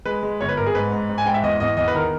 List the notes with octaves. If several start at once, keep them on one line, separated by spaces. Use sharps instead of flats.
G#3 B4
G#3
G1 C#5
B4
G2 A#4
G#4
G#2 B4
G#2
G#2
G#5
G#2 G5
E5
E2 D#5
E2 D#5
E2 D#5
B4
D#3 A#4